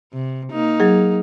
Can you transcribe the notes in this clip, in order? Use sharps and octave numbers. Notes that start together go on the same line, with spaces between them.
C3
A#3 D#4
F#3 G#4